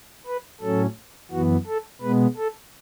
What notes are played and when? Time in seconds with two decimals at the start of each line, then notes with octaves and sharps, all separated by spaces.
0.27 B4
0.61 A2 F#3 C#4 A4
1.31 F#2 E3 B3 F#4
1.67 A4
2.02 B2 G#3 B3 B4
2.37 A4